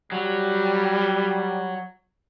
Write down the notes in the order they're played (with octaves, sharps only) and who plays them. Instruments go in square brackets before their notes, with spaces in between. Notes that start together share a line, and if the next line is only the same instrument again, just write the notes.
[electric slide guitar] F#3 [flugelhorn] G3